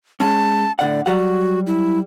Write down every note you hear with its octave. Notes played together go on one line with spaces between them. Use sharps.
G#3 C#4 A5
A2 D3 D5 F#5
F#3 G3 F#4 F#5
E4